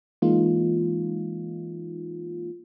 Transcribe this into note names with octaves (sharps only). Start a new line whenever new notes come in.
E3 G#3 A#3 D#4 F4